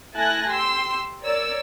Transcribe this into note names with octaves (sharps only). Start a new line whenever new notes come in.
A3 E4 G#5 A5 F#6 A#6
G4 C6 E6
A#4 C#5 D5 E6